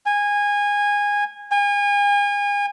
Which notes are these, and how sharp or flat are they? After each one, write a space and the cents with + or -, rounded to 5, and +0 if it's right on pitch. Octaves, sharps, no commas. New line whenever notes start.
G#5 -20
G#5 -35